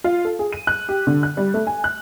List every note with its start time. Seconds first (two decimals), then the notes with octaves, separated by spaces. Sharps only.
0.04 F4
0.25 A4
0.39 G#4
0.53 D#7
0.67 F#6
0.89 G4
1.07 D3
1.23 F#6
1.37 G3
1.54 A3
1.67 G#5
1.84 F#6